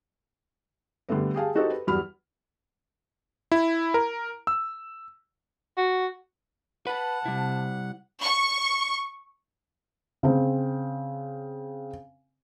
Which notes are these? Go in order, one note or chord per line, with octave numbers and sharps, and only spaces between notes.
D3 G3 A3 B3
G4 G#4 F5 A5
D#4 F#4 G4 A4 C5 D#5
B4
E2 G2 F#3 B5 F6
E4
A#4
E6
F#4
B4 F#5 A5 B5
C3 G3 E4
C#6
C#3 C4